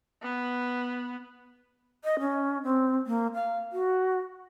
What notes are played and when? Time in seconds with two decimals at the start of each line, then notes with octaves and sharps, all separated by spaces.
0.23 B3
2.05 D#5
2.20 C#4
2.63 C4
3.07 A#3
3.34 F5
3.73 F#4